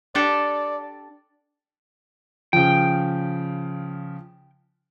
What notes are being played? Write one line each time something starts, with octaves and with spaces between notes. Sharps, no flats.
D4 G4 A4 D5
C#3 F3 G5